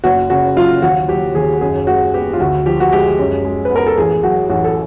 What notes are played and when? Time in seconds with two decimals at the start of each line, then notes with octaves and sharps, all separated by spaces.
0.04 F#1 F#4
0.30 C#3 F#4
0.56 F#3 F4
0.82 D#2 F#4
1.08 F#3 G4
1.35 D#2 G#4
1.61 F#2 G#4
1.87 G#3 F#4
2.13 B3 G4
2.33 F4
2.40 D2 F#4
2.66 F3 G4
2.80 F#4
2.92 G#3 G4
3.19 F#2
3.45 G#3
3.65 B4
3.71 B3
3.76 A#4
3.87 A4
3.97 A1 G#4
4.23 F#3 F#4
4.49 A1 F#4
4.64 A4